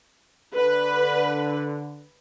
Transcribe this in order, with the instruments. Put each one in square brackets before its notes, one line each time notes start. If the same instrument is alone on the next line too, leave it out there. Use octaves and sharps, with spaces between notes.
[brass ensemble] D3 [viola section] B4